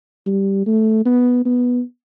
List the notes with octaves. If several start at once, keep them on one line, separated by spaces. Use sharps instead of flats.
G3
A3
B3
B3